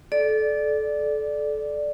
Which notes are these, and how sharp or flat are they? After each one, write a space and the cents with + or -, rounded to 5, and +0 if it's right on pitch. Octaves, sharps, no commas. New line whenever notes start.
A4 -25 D5 +0